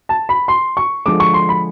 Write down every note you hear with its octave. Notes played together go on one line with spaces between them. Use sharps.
A5
B5
C6
C#6
D3 F3 G#3 D6
C#6
C6
B5